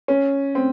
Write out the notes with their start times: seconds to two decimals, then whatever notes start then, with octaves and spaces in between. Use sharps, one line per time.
0.08 C#4
0.55 C4